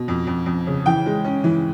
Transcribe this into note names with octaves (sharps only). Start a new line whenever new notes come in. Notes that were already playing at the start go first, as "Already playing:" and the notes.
Already playing: B2
F2
F2
F2
C#3
E3 G5
G#3
C#4
E3